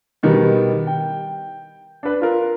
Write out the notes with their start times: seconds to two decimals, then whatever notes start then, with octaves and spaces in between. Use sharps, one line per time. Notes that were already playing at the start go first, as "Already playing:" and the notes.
0.23 B2 D#3 G3 B3
0.87 G5
2.03 D4 B4
2.21 F4 A#4